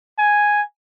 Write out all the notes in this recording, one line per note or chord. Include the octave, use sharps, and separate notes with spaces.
G#5